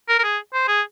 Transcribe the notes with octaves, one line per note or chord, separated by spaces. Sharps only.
A#4
A#4
G#4
C5
G#4